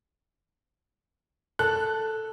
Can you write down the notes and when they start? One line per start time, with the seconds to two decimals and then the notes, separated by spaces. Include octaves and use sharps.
1.59 A4 F#6